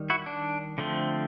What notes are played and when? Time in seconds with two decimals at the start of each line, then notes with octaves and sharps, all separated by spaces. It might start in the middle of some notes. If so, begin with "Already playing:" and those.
Already playing: D#3 G3
0.10 E4 F#4
0.26 D4
0.78 D3 F3 A3 C4